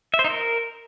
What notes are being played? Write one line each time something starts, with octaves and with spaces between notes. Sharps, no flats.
E5
C5
D#4
A#4